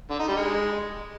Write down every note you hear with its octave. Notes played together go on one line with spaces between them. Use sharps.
D3
D#4
G3
G#3